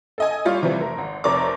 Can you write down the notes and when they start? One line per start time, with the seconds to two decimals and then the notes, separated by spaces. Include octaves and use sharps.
0.18 A4 D#5 G#5
0.45 G3 F4 C#5
0.62 C3 E3 F3 G3
0.80 F1 A3 A#4
0.98 G#1
1.24 F1 C3 A#4 C#5 D5 D6